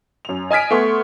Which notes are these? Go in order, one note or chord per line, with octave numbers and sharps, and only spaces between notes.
F#2 F7
D#5 G#5 F6 G#6 B6 D7
A3 B3 C6 C#6